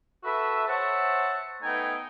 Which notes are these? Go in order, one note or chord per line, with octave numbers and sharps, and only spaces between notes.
F#4 A4 B4 E5
C5 C#5 E5 F#5 A5
A3 B3 D#4 G5 G#5